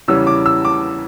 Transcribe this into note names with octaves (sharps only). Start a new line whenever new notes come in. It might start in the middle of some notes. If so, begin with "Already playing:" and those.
E2 C#3 E3 G3 C#4 E6
D6
E6
D6